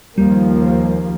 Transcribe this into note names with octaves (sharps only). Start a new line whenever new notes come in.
D#2 F3 G3 A#3